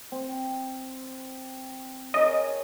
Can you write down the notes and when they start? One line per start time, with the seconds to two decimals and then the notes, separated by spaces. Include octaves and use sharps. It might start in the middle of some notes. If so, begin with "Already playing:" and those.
0.12 C4
2.14 G#4 A#4 C#5 D#5